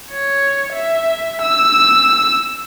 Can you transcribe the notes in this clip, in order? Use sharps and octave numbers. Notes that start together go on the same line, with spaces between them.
C#5
E5
E6